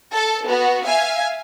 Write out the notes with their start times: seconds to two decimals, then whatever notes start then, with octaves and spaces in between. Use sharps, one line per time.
0.13 A4 A5
0.47 B3 F#4
0.86 E5 F5 G#5